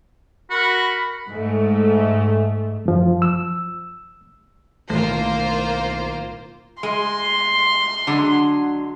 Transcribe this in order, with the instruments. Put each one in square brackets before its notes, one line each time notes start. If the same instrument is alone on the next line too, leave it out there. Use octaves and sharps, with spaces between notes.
[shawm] F#4 [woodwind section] A#4 B5
[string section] G#2 A3
[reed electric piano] F#2 F3
E6
[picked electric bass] B1 A2 D#3 [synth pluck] E3 A3 [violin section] A#3 F4 C5
[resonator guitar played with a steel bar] G#3 [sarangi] C6
[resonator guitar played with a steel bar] D3 F#3 G#3